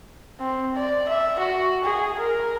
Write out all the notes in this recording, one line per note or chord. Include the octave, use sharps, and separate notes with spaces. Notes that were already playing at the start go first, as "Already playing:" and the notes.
C4
D5
E5
F#4
G#4
A#4